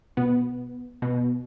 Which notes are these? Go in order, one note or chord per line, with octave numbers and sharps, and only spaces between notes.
B2 B3
B2